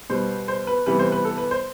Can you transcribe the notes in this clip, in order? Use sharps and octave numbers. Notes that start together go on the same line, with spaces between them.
B2 G3 B3 C5
C5
B4
C3 E3 G3 B3 B4
C5
B4
A4
B4
C5